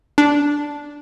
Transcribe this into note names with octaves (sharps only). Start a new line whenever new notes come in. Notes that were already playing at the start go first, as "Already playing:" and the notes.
D4